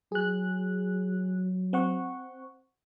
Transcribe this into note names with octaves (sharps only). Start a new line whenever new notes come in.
F#3 G#4 F#6
C4 F#5 C#6